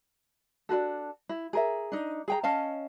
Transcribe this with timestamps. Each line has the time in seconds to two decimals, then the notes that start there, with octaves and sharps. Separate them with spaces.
0.69 D4 F4 F#4 A4
1.29 E4
1.53 G#4 A#4 E5
1.92 D4 D#4
2.28 G#4 G5 A#5
2.43 C#4 D#5 F5 A5